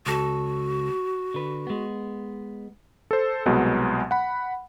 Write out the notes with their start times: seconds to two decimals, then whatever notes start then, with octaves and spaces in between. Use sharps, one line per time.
0.06 C#2 F#4 A4
1.34 D3 B4
1.67 G#3 B3
3.11 A4 C5
3.46 C2 B2 F#3 G#3 B3
4.11 F#5 B5